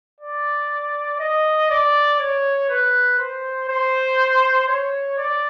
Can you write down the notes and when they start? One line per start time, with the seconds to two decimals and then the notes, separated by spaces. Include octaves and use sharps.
0.20 D5
1.20 D#5
1.70 D5
2.19 C#5
2.69 B4
3.18 C5
3.69 C5
4.68 C#5
5.17 D5